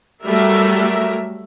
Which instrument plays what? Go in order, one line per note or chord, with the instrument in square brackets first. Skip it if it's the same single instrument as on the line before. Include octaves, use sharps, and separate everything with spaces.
[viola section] F#3 G3 A3 A#4 E5